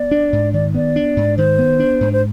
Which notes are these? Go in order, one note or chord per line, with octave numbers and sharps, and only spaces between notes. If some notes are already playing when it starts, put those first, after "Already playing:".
Already playing: B3 D5
D4
G#2
D#3 D5
B3 D5
D4
G#2
D#3 C5
B3
D4
G#2
C5